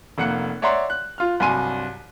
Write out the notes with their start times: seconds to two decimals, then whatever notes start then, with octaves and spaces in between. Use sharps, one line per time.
0.18 F1 A#3 F#5 F#6 C#7
0.62 C#5 D5 E5 F#5 A#5 C6
0.90 F#6
1.18 F4 F6
1.40 C2 G2 F#3 G#5 C6 D#7